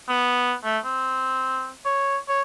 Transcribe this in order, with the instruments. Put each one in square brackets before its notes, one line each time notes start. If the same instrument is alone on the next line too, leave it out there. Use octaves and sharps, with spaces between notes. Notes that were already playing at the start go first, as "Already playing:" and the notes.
[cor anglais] B3
A3
C4
C#5
C#5